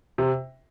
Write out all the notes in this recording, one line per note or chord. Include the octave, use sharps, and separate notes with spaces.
C3